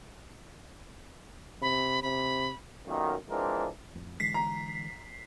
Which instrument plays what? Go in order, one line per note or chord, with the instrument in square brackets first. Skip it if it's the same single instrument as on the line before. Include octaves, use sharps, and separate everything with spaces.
[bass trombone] C3 [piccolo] B5
[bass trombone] C3 [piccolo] B5
[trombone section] B1 F#2 A#2 D#3
E3 F3 G#3 C4 D4 A#4
[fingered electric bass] A1 F2
[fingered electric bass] D3 E3 G#3 [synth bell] B6 C7
[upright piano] A#5